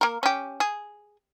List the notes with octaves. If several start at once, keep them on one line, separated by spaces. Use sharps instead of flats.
A#3 A#4
C#4 G4
G#4